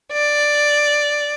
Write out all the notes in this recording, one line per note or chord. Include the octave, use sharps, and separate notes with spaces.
D5